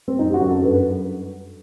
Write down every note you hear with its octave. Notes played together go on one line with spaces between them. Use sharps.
C4
F#2 D#4
G4
F#4
F#2
A4
G2 B4
B4